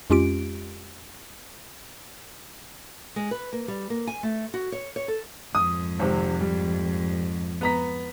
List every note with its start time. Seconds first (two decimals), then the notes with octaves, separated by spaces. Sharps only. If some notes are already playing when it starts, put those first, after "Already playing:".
0.10 F2 G#3 C#4 F4 G4 D7
3.16 G#3
3.31 B4
3.53 A#3
3.68 G3
3.90 A#3
4.07 G#5
4.23 A3
4.54 F#4
4.72 C#5
4.96 C#5
5.08 A4
5.55 F2 G#2 D#6
5.99 G#1 C3 C4
6.40 G3
7.61 B3 A#5 B6